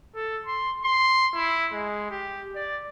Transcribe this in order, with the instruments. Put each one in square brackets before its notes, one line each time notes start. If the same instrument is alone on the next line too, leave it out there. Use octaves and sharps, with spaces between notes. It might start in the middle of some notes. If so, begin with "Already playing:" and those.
[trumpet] A4
C6
C6
E4
G#3
G4
D5